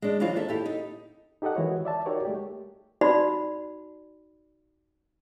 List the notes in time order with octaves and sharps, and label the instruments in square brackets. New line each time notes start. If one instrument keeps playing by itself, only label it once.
[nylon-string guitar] G#3 D4
E3 F#3 D4 F4 C5
D#2 E4 A4 E5
E4 G4 A4
D#4
[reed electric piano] D#4 G4 A4 D#5 F#5
D#3 E3 G#3 E4 F#4 C#5
D5 E5 A5
D#4 F#4 G4 A#4 C#5 D5
G#3 A3 G4
[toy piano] D#4 F#4 D5 B5